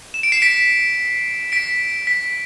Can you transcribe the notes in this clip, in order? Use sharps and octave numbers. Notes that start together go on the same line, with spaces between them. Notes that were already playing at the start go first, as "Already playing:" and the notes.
E7
D7
C7 E7
B6 D7
B6 D7
B6